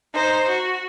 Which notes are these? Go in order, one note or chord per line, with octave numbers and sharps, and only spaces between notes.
D#4 C5
F#4